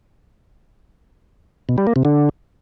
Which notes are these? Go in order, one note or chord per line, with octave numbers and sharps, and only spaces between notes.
B2
G3
A#3
C3
D3